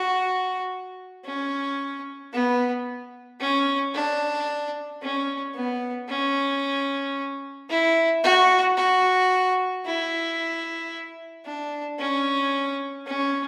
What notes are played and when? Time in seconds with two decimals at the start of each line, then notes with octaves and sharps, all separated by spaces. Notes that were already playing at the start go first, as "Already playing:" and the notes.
Already playing: F#4
1.25 C#4
2.33 B3
3.40 C#4
3.94 D4
5.02 C#4
5.55 B3
6.09 C#4
7.69 E4
8.24 F#4
8.77 F#4
9.85 E4
11.45 D4
11.99 C#4
13.06 C#4